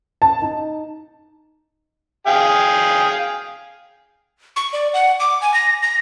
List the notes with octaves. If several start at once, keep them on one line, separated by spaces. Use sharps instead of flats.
A5
D#4
G#4 F5 G5
C#6
D5
F#5
D6
G#5
A#6
A#6